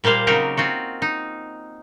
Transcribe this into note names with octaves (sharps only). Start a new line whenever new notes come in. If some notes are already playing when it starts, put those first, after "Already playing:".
A#2 G3 A#3 C5 F5
C#3 F#3 C4 D#4 G4 A#4
C4 F4 F#4
D#4